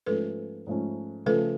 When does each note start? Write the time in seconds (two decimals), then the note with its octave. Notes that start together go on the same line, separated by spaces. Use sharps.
0.06 G#2 F3 A3 C#4 A4 B4
0.67 G#2 F3 A3 C#4
1.26 C#3 F3 A3 A4 B4